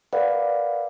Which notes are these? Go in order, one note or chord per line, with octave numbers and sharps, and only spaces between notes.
A#4 B4 D5 F5 F#5